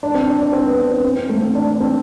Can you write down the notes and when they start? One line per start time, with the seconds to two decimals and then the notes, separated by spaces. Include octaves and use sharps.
0.03 D4
0.15 C4
0.27 D4
0.41 D4
0.53 C4
0.65 B3
0.78 D4
0.91 C4
1.04 C4
1.17 C4
1.29 A3
1.41 C4
1.55 D4
1.73 D4
1.80 C4